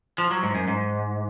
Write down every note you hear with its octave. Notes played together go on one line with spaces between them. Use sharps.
F3
F#3
G#2
F#2
G#2